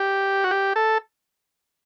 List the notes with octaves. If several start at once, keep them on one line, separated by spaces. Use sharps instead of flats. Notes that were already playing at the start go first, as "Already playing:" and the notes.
Already playing: G4
F#4
G4
A4